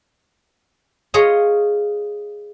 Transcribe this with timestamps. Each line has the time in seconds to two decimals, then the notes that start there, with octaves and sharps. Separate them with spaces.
1.14 F4 G#4 C#5 D#5